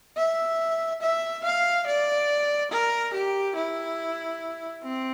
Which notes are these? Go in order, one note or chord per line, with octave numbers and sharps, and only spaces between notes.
E5
E5
F5
D5
A#4
G4
E4
C4